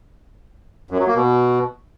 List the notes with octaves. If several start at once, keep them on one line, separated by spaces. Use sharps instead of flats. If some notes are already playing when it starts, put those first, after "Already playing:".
F#2
F#3
A#3
B2